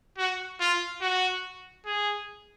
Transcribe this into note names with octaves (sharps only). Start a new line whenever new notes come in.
F#4
F4
F#4
G#4